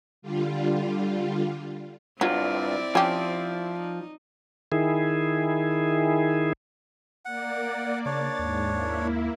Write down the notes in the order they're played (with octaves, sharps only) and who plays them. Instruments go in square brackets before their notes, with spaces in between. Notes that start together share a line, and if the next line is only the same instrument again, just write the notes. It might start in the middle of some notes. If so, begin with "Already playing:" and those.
[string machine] D3 G3 F4
[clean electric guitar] G2 F4 [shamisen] F#3 [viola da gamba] C4 E4 D5
[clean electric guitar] F3 [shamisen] C#4 G4
[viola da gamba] D#4
[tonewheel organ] D#3 E4 G#4
[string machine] A#3 D5 [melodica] F#5
[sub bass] C#3 [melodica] D4 C#5 [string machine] A6
[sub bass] D#2 [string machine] G#2
[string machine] A#3 E4